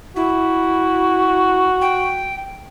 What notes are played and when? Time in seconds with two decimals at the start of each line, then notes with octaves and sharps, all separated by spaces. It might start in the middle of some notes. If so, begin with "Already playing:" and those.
0.16 E4 F#4
1.81 G5